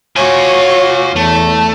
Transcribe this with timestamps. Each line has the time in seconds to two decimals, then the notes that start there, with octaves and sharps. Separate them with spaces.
0.16 F4 F#4 C#5 G#5
1.16 E2 A3